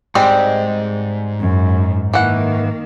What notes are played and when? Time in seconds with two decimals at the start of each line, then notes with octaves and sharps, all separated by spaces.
0.15 G#2 G3 G#3 C4
1.41 F#2
2.14 D#3 E3 A#3 F#5